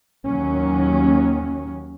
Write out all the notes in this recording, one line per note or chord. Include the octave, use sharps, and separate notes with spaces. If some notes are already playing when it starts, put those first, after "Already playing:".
D#2 D#3 F#3 A#3 C#4